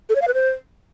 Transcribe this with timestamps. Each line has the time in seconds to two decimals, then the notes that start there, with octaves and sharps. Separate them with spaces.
0.09 A4
0.15 C#5
0.22 F5
0.28 B4
0.34 C5